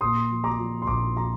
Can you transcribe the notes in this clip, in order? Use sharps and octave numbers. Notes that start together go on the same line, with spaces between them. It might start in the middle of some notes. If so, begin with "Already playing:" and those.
A#2 C6 D#6
F3
A#5 D6
F3
C6
A#1 A#5 D6
F3 A#5 D6